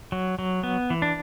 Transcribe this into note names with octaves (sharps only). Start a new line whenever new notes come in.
F#3
F#3
B3
E3
D4